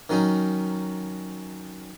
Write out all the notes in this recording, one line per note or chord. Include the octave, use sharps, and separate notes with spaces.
D#3 F#3 C#4 D#4